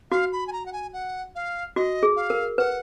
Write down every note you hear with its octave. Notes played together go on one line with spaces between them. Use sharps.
F#4 F5
B5
G#5
A#5
F#5
G#5
F#5
F5
F#4 D#5
G#4
F5
A#4
B4 F#5